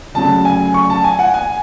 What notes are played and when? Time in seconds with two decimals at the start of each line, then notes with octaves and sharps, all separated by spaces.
0.14 D2 C#3 F#3 A5
0.45 G#5
0.74 C#6
0.90 A5
1.04 G#5
1.19 F#5
1.34 G#5